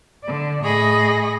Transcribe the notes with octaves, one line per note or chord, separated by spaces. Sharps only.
D3 D5
A2 G#4 D#5 B5 C#6 A#6